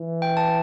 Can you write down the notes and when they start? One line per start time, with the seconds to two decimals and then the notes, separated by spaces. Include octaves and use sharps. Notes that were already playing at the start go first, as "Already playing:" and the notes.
Already playing: E3
0.22 G5
0.37 A5